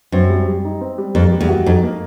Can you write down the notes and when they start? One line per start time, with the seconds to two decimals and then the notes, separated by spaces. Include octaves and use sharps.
0.12 F#2 C4
0.29 G3
0.47 G3
0.64 D#4
0.81 C4
0.98 G3
1.15 F2 A#3
1.32 G3
1.41 E2
1.49 F#4
1.66 F2 D#4
1.83 A#3